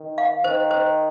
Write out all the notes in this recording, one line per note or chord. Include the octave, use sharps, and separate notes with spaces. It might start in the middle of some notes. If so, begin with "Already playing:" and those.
Already playing: D#3
F5
D#3 C5
C5